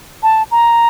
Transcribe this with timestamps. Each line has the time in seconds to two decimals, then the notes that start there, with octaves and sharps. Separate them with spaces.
0.23 A5
0.51 A#5